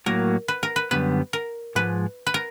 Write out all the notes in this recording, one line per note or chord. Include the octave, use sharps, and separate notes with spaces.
A2 F#3 A#3 A#4
B4
A#4
B4
F#2 D3 G3 B3 B4
A#4
G#2 F3 G#3 B4
B4
A#4